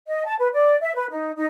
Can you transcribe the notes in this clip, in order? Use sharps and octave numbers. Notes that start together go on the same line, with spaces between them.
D#5
A5
B4
D5
E5
B4
D#4
D#4